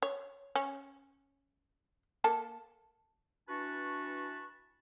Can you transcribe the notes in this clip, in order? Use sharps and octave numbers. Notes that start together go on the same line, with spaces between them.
C#5
C#4
A#3 A4 A5
E3 D4 F#4 B4 A5 C#6